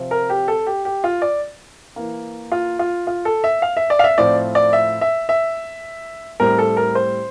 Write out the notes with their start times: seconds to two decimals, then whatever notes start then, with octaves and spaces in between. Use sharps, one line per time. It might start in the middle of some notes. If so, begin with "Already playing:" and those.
Already playing: C3 F3 C4
0.11 A#4
0.30 G4
0.48 A4
0.67 G4
0.85 G4
1.04 F4
1.22 D5
1.96 E3 A#3
2.52 F4
2.79 F4
3.07 F4
3.25 A4
3.44 E5
3.62 F5
3.77 E5
3.90 D5
3.99 F5
4.04 E5
4.18 A2 F3 C4 D5
4.55 D5
4.73 E5
5.01 E5
5.29 E5
6.40 A2 G3 C4 A#4
6.58 A4
6.77 A#4
6.95 C5